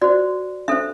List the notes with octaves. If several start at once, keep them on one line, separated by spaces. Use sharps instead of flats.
F#4 C5 D5
D4 A4 C5 E5